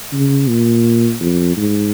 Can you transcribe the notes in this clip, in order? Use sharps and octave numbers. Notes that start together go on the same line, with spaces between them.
C#3
A#2
F2
G#2